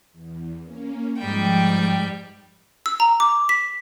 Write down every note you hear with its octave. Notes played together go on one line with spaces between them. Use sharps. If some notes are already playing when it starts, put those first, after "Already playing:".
E2
A#3 C#4
G#2 F3 G3 G5 A5
E6
A#5
D6
B6